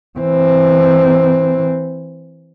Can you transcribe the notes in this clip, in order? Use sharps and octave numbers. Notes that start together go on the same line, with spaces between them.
E3 C4